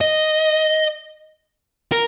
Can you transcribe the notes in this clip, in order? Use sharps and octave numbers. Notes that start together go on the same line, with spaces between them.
D#5
A#4